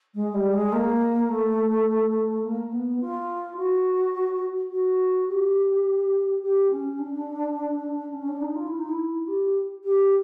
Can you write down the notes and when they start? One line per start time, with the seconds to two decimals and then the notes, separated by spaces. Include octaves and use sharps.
0.15 G#3
0.34 G3
0.53 G#3
0.72 A#3
1.28 A3
2.44 A#3
2.72 B3
3.00 F4
3.57 F#4
4.71 F#4
5.28 G4
6.42 G4
6.71 C#4
6.99 D4
8.13 C#4
8.28 D4
8.41 D#4
8.55 F4
8.67 E4
8.78 D#4
8.89 E4
9.27 G4
9.84 G4